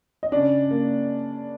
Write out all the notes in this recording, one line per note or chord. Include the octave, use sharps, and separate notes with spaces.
D#5
C#3 D4 D5
A#3